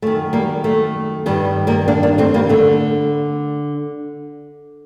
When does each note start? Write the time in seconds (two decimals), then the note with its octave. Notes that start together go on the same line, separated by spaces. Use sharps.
0.02 F#2 D#3 A3
0.33 G3 A#3
0.64 A3
1.26 G2 D#3 G3
1.67 G3 A#3
1.88 A#3 D4
2.03 A#3 D4
2.18 A3 C4
2.34 G3 A#3
2.49 D3 A3